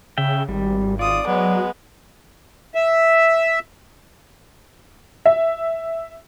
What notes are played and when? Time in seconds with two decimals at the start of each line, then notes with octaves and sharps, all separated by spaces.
0.18 C#3 E5 G5
0.49 G#1 G3
0.99 F4 D5 D#6
1.27 F#3 G#3 B3
2.75 E5
5.26 E5